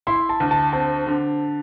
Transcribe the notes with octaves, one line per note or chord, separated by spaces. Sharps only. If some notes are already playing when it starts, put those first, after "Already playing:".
E4 C6
A5
D2
A5
C4 A5
D3